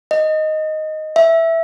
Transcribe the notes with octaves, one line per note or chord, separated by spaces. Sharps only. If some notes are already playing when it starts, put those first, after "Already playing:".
D#5
E5